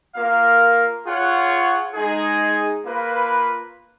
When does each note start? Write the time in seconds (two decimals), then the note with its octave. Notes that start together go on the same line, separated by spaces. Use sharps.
0.15 A#3 F4 A#4 F5
1.05 F4 G#4 C#5 F#5
1.95 G#3 D#4 G#4
2.84 A#3 F4 B4